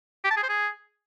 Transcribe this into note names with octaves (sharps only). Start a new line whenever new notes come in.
G4
A5
G#4
C5
G#4